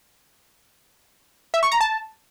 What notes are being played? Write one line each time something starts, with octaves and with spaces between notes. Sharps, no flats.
E5
C#6
A#5
A5